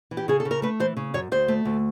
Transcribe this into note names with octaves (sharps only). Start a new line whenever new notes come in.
E3
G4
C#3 G#4
A4
C#3
A#4
A3 B4
E3 C5
C#3
F#2 C#5
D2 C5
A3
D2